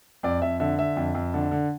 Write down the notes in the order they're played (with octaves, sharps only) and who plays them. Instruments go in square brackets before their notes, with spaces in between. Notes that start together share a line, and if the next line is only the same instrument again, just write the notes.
[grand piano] F2 D5
F2 E5
D3 E5
D3 E5
F2
F2
D3
D3